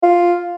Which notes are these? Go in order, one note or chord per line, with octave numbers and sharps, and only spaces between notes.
F4